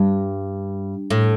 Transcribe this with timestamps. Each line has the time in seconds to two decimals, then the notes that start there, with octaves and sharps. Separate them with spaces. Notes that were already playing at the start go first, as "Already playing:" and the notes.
Already playing: G2
1.10 A2